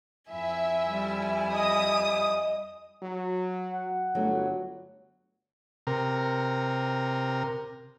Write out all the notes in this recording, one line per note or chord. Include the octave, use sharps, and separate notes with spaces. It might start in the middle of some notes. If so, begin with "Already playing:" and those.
F2 E4 E5 G#5
G3
D#5 D#6
F#3
F#5
G1 F#3 A3
C3 A#4